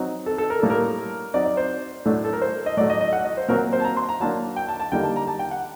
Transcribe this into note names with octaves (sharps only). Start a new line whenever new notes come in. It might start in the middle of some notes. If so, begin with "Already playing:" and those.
Already playing: F#3 C4 D#4
A4
A4
A#4
A2 G3 A#3 D4 A4
A#4
F#3 C4 D#4 D5
D5
C5
A2 F#3 A3 D4
A4
A#4
C5
D#5
A2 F#3 A3 D5
D#5
D#5
F#5
D#5
C5
A#2 F#3 C4 A#4
C5
A5
A#5
C6
A#5
F#3 A#3 D4 A5
G5
A5
A5
D3 G3 A#3 D#4 G5
A5
A#5
A5
G5
F#5